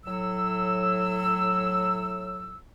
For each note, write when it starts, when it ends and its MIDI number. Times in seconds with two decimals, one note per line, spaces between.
0.05 2.58 45
0.05 2.58 54
0.05 2.58 88